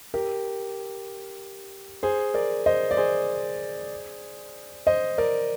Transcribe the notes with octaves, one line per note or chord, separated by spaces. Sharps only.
G4 A#4
G#4 C5
A#4 D5
C5 D#5
D5
G#4 C5
C5 D#5
A#4 D5